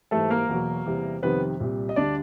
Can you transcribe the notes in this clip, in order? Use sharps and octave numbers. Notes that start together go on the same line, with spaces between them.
G#2 E3 G3 A3 A4
A#3 A#4
E2 B2 F#3
E2 C3 E3 G3
F2 C3 D#3 G3 B3 B4
C2 A#2 G3
D#5
D2 D3 G3 D4 D5